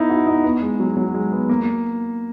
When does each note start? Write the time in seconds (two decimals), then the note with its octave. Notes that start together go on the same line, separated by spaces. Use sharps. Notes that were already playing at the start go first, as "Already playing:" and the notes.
Already playing: B3 D#4 E4
0.10 F#4
0.27 D#4
0.44 B3
0.62 G#3
0.80 F#3
0.97 F#3
1.14 G#3
1.32 B3
1.49 A#3